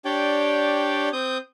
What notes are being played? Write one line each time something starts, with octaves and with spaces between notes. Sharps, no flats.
D4 G4 C#5 D5 G5
C4 D#6 G6